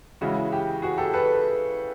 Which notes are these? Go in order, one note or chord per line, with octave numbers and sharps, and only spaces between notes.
C#3 E3 G#3 C#4 E4 F#4
G4
F#4 G#4
G4 A4
A4 B4